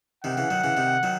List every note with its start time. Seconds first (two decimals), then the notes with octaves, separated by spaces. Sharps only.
0.24 C3 D#3 F#5
0.37 C#3 E3
0.50 D#3 F#3
0.64 C#3 E3
0.77 C3 D#3
1.03 D#3 F#3